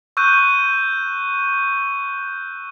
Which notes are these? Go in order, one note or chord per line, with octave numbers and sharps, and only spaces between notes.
C#6 E6 F#6 G6 D#7